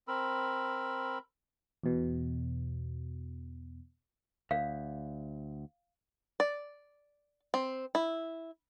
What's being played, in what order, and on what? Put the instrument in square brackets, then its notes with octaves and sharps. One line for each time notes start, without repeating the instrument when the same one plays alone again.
[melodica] C4 A#4 B5 E6
[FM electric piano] E2 B2
[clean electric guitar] D2 [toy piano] F5
[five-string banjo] D5
C4
E4